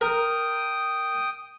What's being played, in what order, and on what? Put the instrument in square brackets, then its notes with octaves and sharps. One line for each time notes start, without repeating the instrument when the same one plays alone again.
[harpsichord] A#4 [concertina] G5 D#6